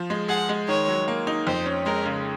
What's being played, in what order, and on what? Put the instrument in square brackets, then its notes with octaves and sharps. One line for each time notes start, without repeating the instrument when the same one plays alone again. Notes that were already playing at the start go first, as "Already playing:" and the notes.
Already playing: [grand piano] F3
G#3
[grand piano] G#4 [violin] F#5
[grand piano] G#3
[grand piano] D#3 [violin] C#5
[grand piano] F#3
A#3
D#4
[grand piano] F2 [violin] C5
[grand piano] C#4
[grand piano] G#3 [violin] A#4
[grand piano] C#3